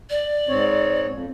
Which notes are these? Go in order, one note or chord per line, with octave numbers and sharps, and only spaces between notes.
D5
G#2 C4 C#5
F2